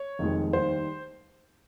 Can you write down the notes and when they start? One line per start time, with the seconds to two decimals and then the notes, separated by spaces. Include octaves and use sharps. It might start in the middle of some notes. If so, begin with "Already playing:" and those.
Already playing: C#5
0.19 F1 F2 D#3 G#3
0.53 D#2 D#3 G3 C5